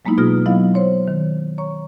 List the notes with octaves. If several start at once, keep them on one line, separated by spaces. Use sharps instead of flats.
F#3 G#3 A#3 B3 D#4 E4
B2 F4 G#4 D#6 F6 A#6
F#3 B3 E4 D#5 F5
C5 C#5 C6
D#3
C#5 A#5 C#6